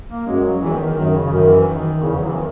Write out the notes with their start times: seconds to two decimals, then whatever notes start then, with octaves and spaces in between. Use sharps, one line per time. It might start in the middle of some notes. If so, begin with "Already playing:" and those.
0.09 A#3
0.26 F#2 G#3
0.44 F#3
0.61 E2 E3
0.74 D#3
0.86 D#3
0.97 F#2 D#3
1.14 C#3
1.25 C#3
1.32 F#2 D#3
1.49 E3
1.67 D#3
2.02 E2 C#3
2.19 F#3
2.28 E3
2.36 D#3